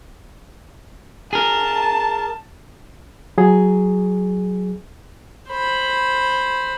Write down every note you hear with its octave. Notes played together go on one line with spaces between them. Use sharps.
G#4 A#4 A5
F#3 G#4
C5 B5